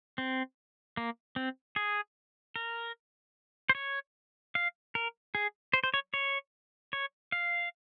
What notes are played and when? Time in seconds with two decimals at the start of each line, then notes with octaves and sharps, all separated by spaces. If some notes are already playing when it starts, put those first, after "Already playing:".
0.18 C4
0.97 A#3
1.36 C4
1.76 G#4
2.56 A#4
3.69 C5
3.75 C#5
4.55 F5
4.95 A#4
5.35 G#4
5.73 C5
5.84 C5
5.94 C#5
6.14 C#5
6.93 C#5
7.32 F5